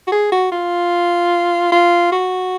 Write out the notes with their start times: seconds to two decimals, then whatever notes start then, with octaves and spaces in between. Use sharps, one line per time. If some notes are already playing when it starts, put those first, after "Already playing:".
0.07 F#4
0.12 G#4
0.32 F#4
0.52 F4
1.72 F4
2.12 F#4